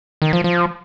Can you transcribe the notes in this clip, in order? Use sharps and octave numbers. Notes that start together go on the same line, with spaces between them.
D#3
F3
F3